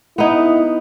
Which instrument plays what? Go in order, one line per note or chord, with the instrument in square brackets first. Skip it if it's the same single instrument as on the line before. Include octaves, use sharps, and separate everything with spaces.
[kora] B3 D#4 [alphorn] E4